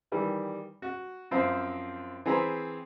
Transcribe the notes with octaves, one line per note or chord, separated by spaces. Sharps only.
D#3 E3 G3
F#4
F#2 F3 C4 C5 F5
E3 C4 G#4 C5 A#5 B5